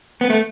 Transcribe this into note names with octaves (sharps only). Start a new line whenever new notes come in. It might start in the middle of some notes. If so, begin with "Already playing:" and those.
B3
A3